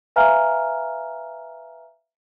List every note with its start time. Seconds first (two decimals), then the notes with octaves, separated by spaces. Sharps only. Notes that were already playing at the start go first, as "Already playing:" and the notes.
0.16 B4 E5 F5 G#5 A#5 F6